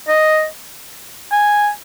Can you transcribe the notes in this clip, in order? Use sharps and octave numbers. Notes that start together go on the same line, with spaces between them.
D#5
G#5